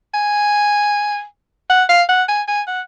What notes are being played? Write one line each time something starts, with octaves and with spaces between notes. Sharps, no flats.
G#5
F#5
F5
F#5
G#5
G#5
F#5